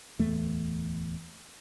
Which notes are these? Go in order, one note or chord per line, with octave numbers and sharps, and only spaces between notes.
D1 E2 A3